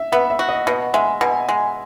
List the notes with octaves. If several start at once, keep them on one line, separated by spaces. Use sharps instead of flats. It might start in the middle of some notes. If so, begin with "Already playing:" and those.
Already playing: E5
B3 E5
E5
F#4
D#5
B2 D#5
G#3 E5
B2 G#5
G#3